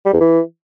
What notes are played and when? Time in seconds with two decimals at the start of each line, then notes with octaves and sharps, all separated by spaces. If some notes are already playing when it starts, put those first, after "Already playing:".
0.05 G3
0.13 E2
0.21 E3